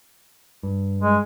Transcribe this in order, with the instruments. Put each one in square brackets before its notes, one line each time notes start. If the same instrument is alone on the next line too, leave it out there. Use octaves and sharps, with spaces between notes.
[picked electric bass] G2
[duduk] G#3